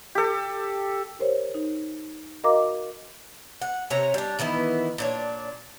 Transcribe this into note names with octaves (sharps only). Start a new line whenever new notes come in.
G4 A4
G4 A#4 C5 C#5
D#4
F#4 A#4 D#5 F5 A#5 D6
F#5
C3 C#5 G#5 A#5
G3 D4
D#3 E3 B3 E4
A#2 D4 C#5